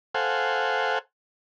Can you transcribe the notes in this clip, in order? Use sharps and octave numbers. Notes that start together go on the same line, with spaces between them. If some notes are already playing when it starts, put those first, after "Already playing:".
A4 C5 F5 F#5 G#5